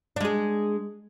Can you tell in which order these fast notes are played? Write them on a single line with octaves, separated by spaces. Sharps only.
D4 G#3 G#4